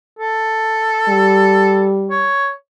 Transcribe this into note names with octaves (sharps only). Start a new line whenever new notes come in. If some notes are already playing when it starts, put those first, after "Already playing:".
A4
G3
C#5